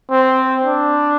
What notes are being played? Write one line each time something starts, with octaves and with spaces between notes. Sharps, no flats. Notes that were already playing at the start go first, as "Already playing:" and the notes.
C4
D4